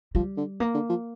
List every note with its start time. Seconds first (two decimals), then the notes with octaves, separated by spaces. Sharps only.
0.15 F3 G3
0.37 D3
0.60 A#3
0.74 D3
0.90 F3